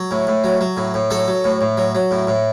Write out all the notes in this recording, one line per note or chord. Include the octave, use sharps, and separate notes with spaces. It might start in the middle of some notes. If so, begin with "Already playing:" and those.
Already playing: F#3
A2
A2
F#3
F#3
A2
A2
F#3 A4
F#3
A2
A2
F#3
F#3
A2
A2